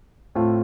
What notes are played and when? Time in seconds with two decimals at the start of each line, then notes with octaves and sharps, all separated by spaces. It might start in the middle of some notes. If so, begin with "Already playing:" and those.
0.35 A2 A3 C4 F4